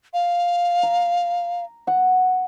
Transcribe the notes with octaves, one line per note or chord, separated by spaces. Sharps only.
F5
A#5
F#5